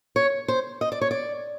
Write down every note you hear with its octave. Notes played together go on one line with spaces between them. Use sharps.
C#5
C5
D#5
D5
C#5
D5